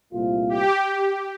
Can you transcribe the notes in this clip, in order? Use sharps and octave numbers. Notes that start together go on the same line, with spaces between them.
C2 A#2 A3 C4 F4
G4